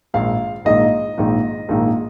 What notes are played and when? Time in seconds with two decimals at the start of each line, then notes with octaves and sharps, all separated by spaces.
0.14 A#1 G#2 D#3 A#3 F5
0.65 A#1 G#2 D#3 A#3 D#5
1.18 A#1 G#2 D#3 A#3
1.69 A#1 G#2 D#3 A#3